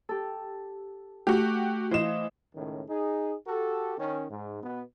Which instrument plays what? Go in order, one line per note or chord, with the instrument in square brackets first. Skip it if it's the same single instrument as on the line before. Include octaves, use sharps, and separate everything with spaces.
[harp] G4 A4
[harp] A3 [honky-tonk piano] F#4 G4
[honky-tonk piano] E3 E7 [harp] C5 D#5 F5
[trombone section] C#2 A2 D#3 C#4
D#4 G#4
F#4 G4 A4
D#3 C#4
G#2
B2 B3